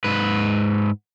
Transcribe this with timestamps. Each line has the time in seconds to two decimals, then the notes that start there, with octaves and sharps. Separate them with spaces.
0.04 G#2 B4